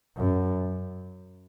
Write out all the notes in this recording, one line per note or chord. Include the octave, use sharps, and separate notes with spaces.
F#2